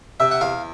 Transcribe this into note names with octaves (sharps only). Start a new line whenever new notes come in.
C3 E5
F#5
E2 F5